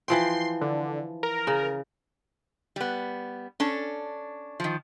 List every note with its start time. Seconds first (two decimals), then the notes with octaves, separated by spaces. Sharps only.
0.08 E3 F3 G5 C6
0.61 D3
1.23 A#4
1.47 C#3
2.76 G3 B3
3.60 C#4 D4 A4
4.60 D#3 F3